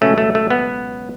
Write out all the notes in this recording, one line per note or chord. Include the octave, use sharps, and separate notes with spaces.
C#2 B2 F#3 A3 C#4
A3
A3
B3